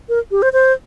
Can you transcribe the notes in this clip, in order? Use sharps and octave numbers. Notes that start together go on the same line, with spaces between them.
A#4
G4
C5
C5